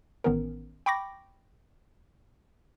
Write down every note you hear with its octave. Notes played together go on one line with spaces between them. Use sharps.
A1 D#3 B3 C#4 A#4
G5 B5 C#6 D6 A#6